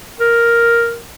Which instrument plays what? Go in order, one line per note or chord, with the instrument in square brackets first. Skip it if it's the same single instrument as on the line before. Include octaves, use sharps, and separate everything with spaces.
[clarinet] A#4